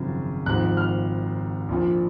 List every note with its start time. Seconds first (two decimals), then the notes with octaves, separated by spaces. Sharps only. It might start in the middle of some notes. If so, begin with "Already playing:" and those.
Already playing: G#1 F#2 C#3 F3
0.46 G#1 G#2 F3 F#6
0.77 F6
1.69 A#1 A#2 F3